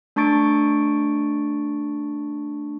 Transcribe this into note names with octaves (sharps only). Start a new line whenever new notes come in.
A3 D4 A5 C#6 A6 D7